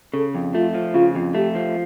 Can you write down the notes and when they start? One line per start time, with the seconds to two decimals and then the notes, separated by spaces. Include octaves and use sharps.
0.14 C#3 A4
0.35 F2
0.54 A3 F4
0.74 F3
0.94 C#3 F4
1.15 F2
1.35 A3 G4
1.55 F3